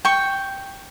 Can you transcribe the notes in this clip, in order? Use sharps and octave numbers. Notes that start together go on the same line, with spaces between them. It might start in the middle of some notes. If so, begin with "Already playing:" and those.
G5 C#6